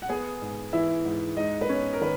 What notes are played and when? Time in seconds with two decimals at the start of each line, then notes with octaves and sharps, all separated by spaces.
0.02 F#5
0.09 B3 G#4 G#5
0.42 G#2
0.73 E3 E4 E5
1.05 G#2
1.37 G#3 D#4 D#5
1.61 B4
1.69 B3 C#4 C#5
1.93 A#4
2.01 D#3 B4